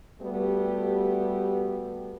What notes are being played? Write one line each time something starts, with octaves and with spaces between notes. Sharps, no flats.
G3 A3 B3 F#4 G4